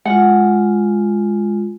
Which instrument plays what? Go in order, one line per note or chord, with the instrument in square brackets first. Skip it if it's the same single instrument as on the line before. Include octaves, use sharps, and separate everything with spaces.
[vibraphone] G#3 F4 [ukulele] F#5